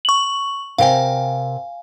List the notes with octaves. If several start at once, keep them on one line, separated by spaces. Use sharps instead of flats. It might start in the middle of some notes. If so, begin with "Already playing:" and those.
C#6 F#7
C3 A#4 F5 G5 G#5